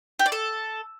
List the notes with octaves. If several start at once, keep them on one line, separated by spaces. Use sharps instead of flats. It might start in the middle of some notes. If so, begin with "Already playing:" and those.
G4
D5
A4